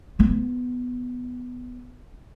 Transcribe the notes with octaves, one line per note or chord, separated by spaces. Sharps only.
B3 F4